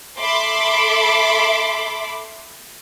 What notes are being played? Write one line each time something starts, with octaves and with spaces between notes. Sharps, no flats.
A4 E5 B5 C6 D6